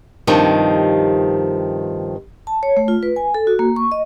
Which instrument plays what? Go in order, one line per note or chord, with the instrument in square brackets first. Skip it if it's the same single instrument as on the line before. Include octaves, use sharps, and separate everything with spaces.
[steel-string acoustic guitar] G2 C3 D#3 F3
[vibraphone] A5
C#5
A3
F4
B4
G#5
A4
F#4
A#3
C#6
D#5